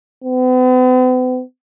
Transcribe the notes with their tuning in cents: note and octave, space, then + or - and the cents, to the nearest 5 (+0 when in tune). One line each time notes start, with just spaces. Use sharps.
B3 +45